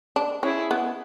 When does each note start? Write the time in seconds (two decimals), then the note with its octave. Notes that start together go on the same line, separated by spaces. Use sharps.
0.16 D4
0.43 C#4 E4 G#4
0.71 B3